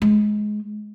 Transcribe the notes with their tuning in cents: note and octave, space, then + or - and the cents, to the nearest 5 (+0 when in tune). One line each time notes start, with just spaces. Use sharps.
G#3 +20